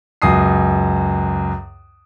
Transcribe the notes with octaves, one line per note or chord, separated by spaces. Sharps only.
C#2 F#2 D#6 C7